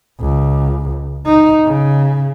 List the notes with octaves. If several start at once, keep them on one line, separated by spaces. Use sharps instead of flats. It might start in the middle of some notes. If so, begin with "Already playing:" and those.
C#2
D#4
C#3